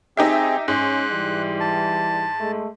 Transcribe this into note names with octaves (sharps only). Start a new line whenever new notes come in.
C4 D#4 G4 G#4 E5
G#2 C#4 F#6
E3 G3
A5
G#3 A3